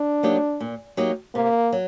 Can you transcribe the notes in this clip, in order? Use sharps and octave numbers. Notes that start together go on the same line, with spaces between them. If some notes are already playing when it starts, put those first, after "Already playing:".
Already playing: D4
F#3 A#3 D#4 G4
A#2
F#3 A#3 D#4 G4
C3 A#3
F#3